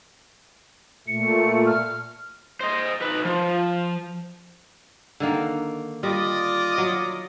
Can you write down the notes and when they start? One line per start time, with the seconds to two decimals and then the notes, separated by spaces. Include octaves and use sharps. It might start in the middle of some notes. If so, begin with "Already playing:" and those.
1.08 A#2 A3 C#7
1.66 F6
2.61 C5 D#5
3.02 D#4 B4
3.25 F3
5.20 D3 D#3 A#3
6.03 G3 F4 D5 D#5
6.78 F#3